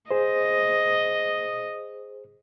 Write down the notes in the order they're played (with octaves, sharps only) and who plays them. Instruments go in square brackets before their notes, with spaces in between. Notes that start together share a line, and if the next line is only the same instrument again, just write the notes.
[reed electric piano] G#4 C5 [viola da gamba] D#5